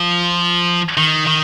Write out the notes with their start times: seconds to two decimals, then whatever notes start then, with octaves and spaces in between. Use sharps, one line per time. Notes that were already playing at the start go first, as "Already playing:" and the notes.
Already playing: F3
0.97 D#3
1.27 D#3